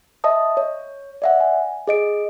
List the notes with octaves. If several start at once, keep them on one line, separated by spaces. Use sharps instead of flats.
D#5 E5 A5 D#6
C#5
D5 E5 F#5
G#5
G#4 D#5 D7